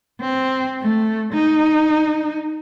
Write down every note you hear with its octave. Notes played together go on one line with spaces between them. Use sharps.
C4
A3
D#4